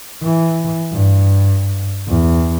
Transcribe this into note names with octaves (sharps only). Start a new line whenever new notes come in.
E3
G2
E2